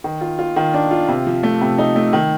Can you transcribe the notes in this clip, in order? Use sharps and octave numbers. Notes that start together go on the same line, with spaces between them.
D#3
F4
F4
D#3
D4
F4
C3
F3
A3
C3
D#4
A3
D#3